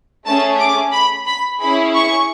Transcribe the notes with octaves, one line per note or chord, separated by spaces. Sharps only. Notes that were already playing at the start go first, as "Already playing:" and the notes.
A3 C#4 G#4 A5
D6
B5
B5
C#4 E4 G#4 B5
C#6